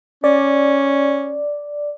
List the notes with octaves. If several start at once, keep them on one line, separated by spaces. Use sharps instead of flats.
C#4 D5